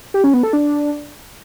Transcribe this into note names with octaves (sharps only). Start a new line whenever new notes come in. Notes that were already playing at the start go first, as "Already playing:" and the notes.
G4
C#4
B3
A4
D4